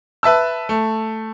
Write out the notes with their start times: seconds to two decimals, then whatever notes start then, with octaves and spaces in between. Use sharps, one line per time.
0.23 B4 E5 A5 E6
0.69 A3